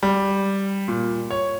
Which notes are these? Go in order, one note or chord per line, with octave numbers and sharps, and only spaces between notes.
G3
A#2
C#5